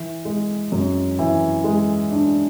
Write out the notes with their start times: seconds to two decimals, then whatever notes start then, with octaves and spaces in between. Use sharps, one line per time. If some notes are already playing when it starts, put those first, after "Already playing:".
Already playing: E3
0.25 G#3
0.72 F#2
1.19 E3
1.64 G#3
2.12 D4